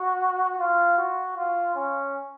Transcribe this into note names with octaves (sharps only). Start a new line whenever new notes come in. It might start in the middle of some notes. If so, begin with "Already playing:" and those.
Already playing: F#4
F4
F#4
F4
C#4